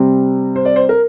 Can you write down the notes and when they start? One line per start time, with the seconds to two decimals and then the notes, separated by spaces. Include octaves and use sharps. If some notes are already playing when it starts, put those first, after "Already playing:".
Already playing: C3 G3 C4
0.56 C5
0.65 D5
0.76 C5
0.89 A#4